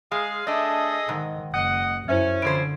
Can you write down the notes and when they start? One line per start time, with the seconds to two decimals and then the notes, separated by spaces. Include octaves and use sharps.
0.12 G#3 G#4 F5
0.47 A3 D4 G#4 A4 D#5
1.09 G#2 D#3
1.54 F#1 D#5 F#5
2.08 F#2 C#4 E4 C5 E5
2.42 D3 E3 F3 C5 G#6 D7